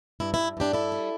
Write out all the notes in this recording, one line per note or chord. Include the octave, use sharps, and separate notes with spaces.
G2 E4
G2 E4
G2 D4 G4
G2 E4 A4
G3